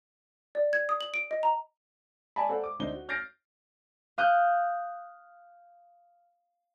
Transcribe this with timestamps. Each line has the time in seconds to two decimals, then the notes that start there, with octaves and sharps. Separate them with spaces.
0.55 D5
0.73 G#6
0.89 D#6
1.01 F#7
1.14 D7
1.31 D#5
1.43 A#5
2.36 D5 G#5 A5 B5
2.49 A4 C5 D5 F#5
2.64 D6
2.80 D2 D4 D#4 C5 G7
2.93 F#4
3.09 F6 G6 A6 A#6 C7 D7
4.18 F5 D#6 F#6 G6